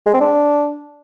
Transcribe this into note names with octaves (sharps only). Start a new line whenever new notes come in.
G#3
C4
D4